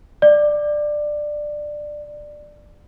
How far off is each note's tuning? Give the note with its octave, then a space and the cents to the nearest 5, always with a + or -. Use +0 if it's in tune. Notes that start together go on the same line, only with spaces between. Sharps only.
D5 +15